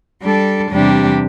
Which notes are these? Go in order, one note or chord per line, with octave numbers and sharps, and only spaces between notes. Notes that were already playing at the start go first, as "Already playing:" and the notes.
G3 D4 A4
E2 C3 G3 D4 G4